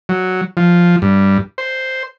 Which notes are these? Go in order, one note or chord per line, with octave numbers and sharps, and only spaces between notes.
F#3
F3
G2
C5